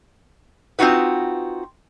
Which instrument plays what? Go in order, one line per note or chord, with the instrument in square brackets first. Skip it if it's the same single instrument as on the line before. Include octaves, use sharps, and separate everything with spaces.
[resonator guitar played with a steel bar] C4 D#4 F4 F#4 B4